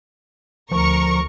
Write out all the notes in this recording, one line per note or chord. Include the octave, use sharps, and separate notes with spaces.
D2 F3 A#4 C#6